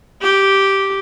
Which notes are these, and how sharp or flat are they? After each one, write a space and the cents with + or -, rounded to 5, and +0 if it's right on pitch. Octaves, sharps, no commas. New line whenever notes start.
G4 -5